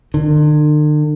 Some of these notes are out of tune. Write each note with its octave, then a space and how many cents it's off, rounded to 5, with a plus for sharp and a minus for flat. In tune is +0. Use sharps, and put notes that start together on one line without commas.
D3 +45